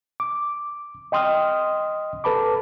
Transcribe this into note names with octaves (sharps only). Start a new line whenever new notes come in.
D6
D#5 G5 C6 D#6 F6
A4 B4 A5 B5 D6